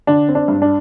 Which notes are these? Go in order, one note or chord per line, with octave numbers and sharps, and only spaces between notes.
D3 D4
C4
D4
G2
D4